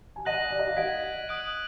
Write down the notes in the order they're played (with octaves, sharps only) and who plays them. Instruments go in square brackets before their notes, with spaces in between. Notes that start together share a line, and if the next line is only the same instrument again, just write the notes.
[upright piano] G#5
[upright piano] D#5 F#5 [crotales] F#6 A#6 D#7 F#7
[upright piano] D5
D#5
F5
[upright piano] D#5 F#5 [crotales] G#6 B6 D7
[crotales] D#6 F#6 D7 F#7